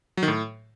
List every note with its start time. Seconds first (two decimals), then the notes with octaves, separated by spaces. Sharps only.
0.17 F#3
0.23 D#3
0.28 A2